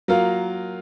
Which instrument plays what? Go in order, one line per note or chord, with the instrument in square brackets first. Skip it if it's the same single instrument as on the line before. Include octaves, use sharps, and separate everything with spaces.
[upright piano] F#3 A#3 F4 A#4